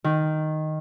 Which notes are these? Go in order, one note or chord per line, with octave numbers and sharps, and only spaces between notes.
D#3